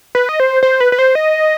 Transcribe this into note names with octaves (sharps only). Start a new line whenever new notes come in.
B4
D#5
C5
C5
B4
B4
C5
D#5